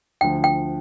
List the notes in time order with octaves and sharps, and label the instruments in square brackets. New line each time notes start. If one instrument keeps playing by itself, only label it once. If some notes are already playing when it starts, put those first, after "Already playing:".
[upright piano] D2 D3 F3 [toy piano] G5
[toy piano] G5